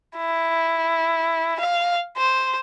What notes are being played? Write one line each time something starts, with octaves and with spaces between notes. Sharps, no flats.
E4
F5
C5